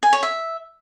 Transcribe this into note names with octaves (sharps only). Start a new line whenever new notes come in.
G#5
C#5
E5